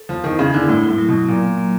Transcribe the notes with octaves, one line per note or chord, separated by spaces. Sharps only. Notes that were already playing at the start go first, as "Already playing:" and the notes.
Already playing: A4
F3 B3
D#3 E4
C#3 G#4
D3 E4
A2 E4
A2 E4
F#3
B2
F#3
A#2 A#3
A#3
A#3